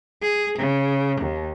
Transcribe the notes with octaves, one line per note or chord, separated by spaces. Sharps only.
G#4
C#3
D#2